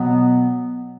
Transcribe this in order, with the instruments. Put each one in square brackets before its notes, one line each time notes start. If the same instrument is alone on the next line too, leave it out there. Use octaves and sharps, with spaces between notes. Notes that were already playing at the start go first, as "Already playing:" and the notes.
Already playing: [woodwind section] B2 F#3 B3